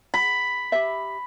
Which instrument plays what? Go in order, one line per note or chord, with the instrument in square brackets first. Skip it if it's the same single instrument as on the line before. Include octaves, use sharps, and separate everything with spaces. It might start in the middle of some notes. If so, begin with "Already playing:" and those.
[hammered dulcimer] B5
[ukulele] G4 E5